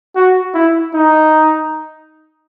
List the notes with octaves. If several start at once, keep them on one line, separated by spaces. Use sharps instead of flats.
F#4
E4
D#4